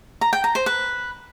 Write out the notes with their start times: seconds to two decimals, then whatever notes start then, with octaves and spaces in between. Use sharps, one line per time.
0.21 A#5
0.33 G5
0.44 A#5
0.55 C5
0.66 B4